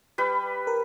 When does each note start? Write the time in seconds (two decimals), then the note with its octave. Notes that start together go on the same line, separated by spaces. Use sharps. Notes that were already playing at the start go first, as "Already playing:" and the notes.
0.18 G3 B4
0.67 A#4